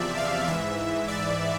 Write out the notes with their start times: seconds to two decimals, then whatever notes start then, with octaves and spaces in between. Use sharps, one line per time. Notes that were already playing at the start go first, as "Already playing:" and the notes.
Already playing: E2 C3 F3 D5 E5
0.17 F5
0.48 G#2 E3 E5
1.08 D5